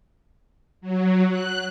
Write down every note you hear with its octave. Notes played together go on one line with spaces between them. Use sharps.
F#3
F#6